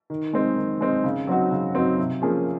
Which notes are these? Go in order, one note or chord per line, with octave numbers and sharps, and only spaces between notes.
D#3
G#3 C4 D#4
D#3
G#3 C4 D#4
C#3
F#3 C4 D#4 F#4
C#3
F#3 C4 D#4 F#4
C3
F3 A#3 C#4 G#4